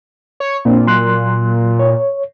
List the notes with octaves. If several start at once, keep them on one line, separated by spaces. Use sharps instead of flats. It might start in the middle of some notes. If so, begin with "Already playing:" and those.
C#5
A#2 A#3 C4 D4
F#3 C6 F#6
C#5